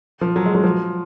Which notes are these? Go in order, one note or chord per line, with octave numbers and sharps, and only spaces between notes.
F3
F#3
G#3
F#3
F3